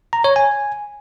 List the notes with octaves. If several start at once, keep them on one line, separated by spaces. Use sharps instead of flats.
A#5
C#5
G#5